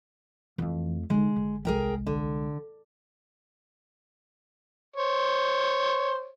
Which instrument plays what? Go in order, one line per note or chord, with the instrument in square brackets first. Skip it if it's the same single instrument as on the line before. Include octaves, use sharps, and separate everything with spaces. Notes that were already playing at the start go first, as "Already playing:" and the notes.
[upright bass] F2 A3 [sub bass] E3
[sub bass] F1 [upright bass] D3 D#4 [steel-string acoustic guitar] G#3
[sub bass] G#1 [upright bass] D3
[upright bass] C2 G#3 [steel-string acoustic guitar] G#4 A#4 G5
[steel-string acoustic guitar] D3
[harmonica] C5 C#5